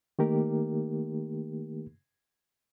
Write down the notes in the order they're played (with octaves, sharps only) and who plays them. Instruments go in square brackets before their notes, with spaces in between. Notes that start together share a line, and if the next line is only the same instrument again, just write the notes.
[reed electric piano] D#3 A3 A#3 D#4 G4 A#4